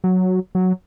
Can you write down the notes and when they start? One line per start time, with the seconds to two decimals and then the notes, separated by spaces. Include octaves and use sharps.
0.04 F#3
0.55 F#3